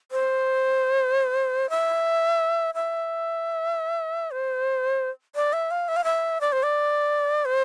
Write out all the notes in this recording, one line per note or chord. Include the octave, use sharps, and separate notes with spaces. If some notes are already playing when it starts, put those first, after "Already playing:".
C5
E5
E5
C5
D5
E5
F5
E5
F5
E5
D5
C5
D5
C5